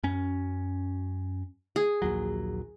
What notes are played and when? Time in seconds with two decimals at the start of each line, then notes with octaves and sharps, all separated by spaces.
0.03 F#2 C#4
1.76 G#4
2.02 A#1 D#2 F#3